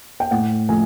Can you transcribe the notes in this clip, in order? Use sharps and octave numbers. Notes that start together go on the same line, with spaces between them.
G5
A2 F#5
F3 A3 G#5